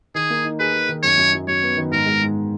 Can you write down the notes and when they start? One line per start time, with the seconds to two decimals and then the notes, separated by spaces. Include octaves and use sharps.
0.15 D#3 G#4
0.30 A#3
0.44 D#4
0.60 G#4 B4
0.73 G#4
0.89 D#3
1.03 F#2 C#5
1.17 F#2
1.33 F#3
1.48 F#2 C#5
1.63 B3
1.77 D#3
1.91 G#2 A#4
2.06 G#3
2.21 G#2